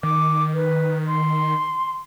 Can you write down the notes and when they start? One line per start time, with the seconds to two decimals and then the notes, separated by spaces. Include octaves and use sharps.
0.03 D#3 D6
0.54 B4
1.07 C6